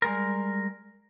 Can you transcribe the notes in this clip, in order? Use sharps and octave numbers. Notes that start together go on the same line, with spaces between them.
G3 G#3 A#4